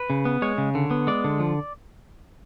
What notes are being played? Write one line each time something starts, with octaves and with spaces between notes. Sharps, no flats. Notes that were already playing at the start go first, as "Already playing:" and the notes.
Already playing: B4
C#3
B3
G#3 C#5
C#3
D3
B3
G#3 D5
D3
F3